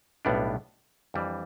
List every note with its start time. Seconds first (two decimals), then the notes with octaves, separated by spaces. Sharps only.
0.25 B1 A2 G3 B3 D4
1.14 F2 E3 G3 D4